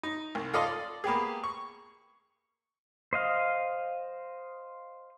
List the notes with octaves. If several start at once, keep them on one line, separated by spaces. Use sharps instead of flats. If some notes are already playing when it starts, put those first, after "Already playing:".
D#4
C2
F4 A4 D5 D#5 F5 C6
D5
A#3 B3 G4 G#4
C#6
C5 D#5 F5